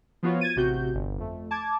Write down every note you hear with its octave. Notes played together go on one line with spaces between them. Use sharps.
F3 B3 F4 F#4 C#5
G#6 A6 D#7
A1 C3 F#4 G6
G1
F2 A3
A5 D6 G#6